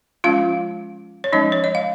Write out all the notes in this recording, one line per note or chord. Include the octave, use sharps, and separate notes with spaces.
F3 G#3 C#4 F4 F5
C#5
F3 G#3 C#4 D#4 D#5
C#5
D#5
F5